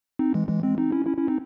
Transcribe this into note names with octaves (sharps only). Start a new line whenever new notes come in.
C4 D#4
E3 G#3
E3 G#3
G#3 C4
C4 D#4
C#4 E4
C#4 E4
C#4 E4
C4 D#4